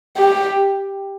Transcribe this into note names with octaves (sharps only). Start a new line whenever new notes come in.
G4